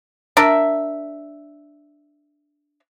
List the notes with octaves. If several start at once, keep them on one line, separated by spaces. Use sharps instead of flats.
D4 A#4 E5